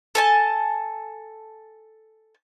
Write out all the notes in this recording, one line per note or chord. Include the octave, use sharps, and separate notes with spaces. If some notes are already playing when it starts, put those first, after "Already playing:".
A4 G#5 A5